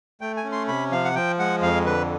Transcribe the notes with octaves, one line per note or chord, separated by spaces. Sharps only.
A3 G5
G#5
C#4
C6
C3 B5
F3 F5
F#5
F3 G5
G#3 F#5
F2 F5
D3 B4